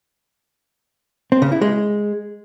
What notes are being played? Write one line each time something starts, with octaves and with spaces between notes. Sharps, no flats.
C4
C#3
E4
G#3